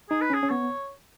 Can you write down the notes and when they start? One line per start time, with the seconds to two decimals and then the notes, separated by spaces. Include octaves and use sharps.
0.10 D#4 G#4
0.21 B4
0.30 C#4 G#4
0.43 C#4
0.50 B3 C#5